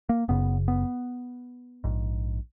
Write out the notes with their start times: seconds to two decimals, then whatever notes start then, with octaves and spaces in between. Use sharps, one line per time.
0.09 A#3
0.28 F#1 F#2 C#3 B3
0.68 B3
1.84 A#1 G#2